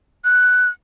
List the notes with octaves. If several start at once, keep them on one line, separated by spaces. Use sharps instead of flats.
F#6